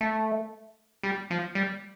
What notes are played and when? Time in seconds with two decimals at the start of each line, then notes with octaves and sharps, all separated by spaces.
0.01 A3
1.03 G3
1.30 F3
1.55 G3